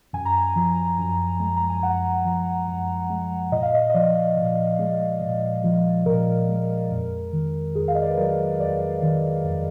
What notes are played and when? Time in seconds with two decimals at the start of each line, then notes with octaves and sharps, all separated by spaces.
0.13 F#2 G#5
0.25 A#5
0.38 G#5
0.56 F3
0.98 F#2
1.40 G#3
1.56 A#5
1.70 G#5
1.83 F#2 F#5
2.25 F3
2.67 F#2
3.10 G#3
3.52 A#2 D#5
3.63 F5
3.74 D#5
3.90 D#5
3.94 F3 D5
4.37 A#2
4.79 G#3
5.21 A#2
5.64 F3
6.06 A#2 A#4
6.49 G#3
6.90 F2
7.33 D#3
7.75 F2 G#4
7.88 F5
7.95 D#5
8.02 D5
8.10 B4
8.17 F#3 A#4
8.60 F2 D5
9.02 D#3
9.44 F2